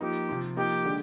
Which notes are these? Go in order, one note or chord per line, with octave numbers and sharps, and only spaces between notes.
F3 A#3 D#4 G4
C3 F3 C4
F3 A#3 D#4 G4
D3 G#3